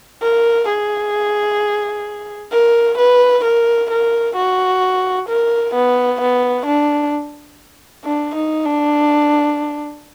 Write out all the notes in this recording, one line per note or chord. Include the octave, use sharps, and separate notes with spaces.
A#4
G#4
A#4
B4
A#4
A#4
F#4
A#4
B3
B3
D4
D4
D#4
D4